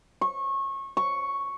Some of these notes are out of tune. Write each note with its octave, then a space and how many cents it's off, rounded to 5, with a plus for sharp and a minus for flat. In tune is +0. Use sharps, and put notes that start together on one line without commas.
C#6 -25
C#6 +0